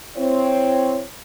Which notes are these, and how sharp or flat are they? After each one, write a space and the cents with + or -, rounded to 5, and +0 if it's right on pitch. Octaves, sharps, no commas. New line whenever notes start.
C4 +0 E4 +30 C#5 +0